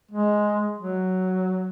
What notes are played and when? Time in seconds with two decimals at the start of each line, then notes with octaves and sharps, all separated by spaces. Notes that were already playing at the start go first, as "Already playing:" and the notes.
0.11 G#3
0.78 F#3